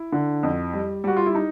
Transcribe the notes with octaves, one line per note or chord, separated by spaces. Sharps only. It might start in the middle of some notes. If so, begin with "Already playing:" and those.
Already playing: E4
D3
F2
G3
G3 F#4
F4
E4
D#4